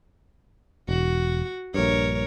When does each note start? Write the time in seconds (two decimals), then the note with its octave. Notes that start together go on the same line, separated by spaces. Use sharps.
0.89 E1 F#4
1.74 A#1 G2 A#4 C#5